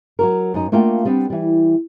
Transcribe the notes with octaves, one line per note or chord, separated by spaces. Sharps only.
F#3 F#4 A#4
F#2 D#4
A3 A#3 D4 F4 F#5 G5
G3 B3 C4 D4
E3 G3